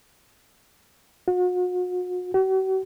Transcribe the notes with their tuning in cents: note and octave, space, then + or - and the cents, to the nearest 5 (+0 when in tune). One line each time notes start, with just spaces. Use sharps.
F#4 -40
F#4 +45